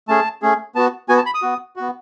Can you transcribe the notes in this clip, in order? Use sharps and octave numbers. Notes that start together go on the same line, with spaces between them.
A3 C#4 G#4 A5
A3 C#4 G#4
B3 F#4 A5
B3 F#4 G#5
A5
B5
D#6
B3 F#4
B3 F#4